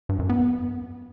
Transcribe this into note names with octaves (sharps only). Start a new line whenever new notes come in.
G2
F#2
B3